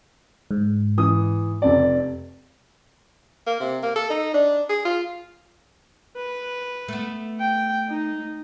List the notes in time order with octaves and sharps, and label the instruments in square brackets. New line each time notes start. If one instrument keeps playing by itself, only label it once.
[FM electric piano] G#2
[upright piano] E3 D#6
F1 F2 D5
[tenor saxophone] A#3
C3
A#3
A4
D#4
D4
G#4
F4
[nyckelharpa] B4
[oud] A3 B3
[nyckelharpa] G5
D#4